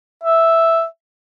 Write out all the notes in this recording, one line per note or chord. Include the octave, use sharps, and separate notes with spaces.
E5